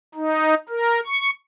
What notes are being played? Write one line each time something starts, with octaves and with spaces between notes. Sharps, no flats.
D#4
A#4
C#6